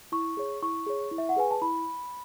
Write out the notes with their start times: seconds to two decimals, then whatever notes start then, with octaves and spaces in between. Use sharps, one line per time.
0.12 E4 C#6
0.37 G#4 C#5
0.62 E4 C#6
0.86 G#4 C#5
1.11 E4
1.18 E5
1.29 F#5
1.36 G#4 B4 G#5
1.51 A5
1.62 E4 B5